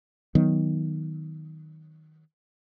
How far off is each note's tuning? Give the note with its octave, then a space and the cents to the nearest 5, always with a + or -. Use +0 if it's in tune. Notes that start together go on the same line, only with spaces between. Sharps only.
D#3 +10 F#3 +0 B3 +0